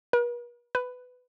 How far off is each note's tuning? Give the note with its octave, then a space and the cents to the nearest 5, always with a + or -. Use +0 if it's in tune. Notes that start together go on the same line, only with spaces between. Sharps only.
B4 -45
B4 +15